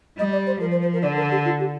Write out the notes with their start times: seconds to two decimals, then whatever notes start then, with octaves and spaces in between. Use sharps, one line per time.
0.18 G3 D#5
0.32 D5
0.46 C5
0.60 F3 A#4
0.71 C5
0.82 C5
0.93 A#4
1.02 D3 D5
1.17 A#4
1.31 G4
1.45 F4
1.60 G4